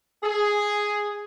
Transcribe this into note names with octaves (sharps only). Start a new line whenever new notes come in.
G#4